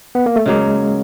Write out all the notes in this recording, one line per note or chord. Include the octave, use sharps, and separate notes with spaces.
B3
A#3
A3
C#3 F#3 G#3 A#3